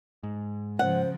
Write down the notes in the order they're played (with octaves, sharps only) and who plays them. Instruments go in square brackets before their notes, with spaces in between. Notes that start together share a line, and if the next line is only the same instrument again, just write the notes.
[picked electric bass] G#2
[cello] C#3 F3 [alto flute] C5 [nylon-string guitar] F#5